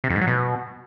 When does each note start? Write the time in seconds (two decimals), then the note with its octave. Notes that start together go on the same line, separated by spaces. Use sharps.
0.04 C3
0.10 F2
0.15 G#2
0.21 F#3
0.27 B2